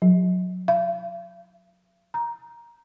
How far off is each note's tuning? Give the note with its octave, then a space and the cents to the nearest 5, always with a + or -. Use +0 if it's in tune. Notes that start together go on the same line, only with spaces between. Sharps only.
F#3 -25
F5 -45
A#5 +10